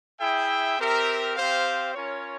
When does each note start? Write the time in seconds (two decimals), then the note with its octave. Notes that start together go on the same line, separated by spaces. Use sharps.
0.20 E4 G#4 E5 G5
0.78 C4 G4 A#4 E5
1.36 C4 G4 C5 F5
1.94 C#4 F4 A#4 C#5